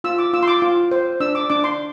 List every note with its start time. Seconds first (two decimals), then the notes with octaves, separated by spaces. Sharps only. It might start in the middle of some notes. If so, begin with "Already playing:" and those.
0.04 F4 E6
0.18 D6
0.33 F4 E6
0.43 C6
0.48 D6
0.62 F4
0.91 C5
1.20 D4 E6
1.35 D6
1.50 D4 D6
1.64 C6